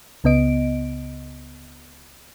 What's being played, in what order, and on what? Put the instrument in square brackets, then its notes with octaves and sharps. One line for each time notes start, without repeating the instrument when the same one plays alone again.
[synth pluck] C#2 C#3 B3 D#5 D7